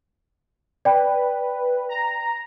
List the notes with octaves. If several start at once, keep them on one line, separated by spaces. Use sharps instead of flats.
B4 D5 G5
A#5